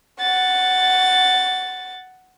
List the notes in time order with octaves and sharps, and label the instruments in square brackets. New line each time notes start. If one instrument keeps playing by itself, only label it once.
[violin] F#5 A6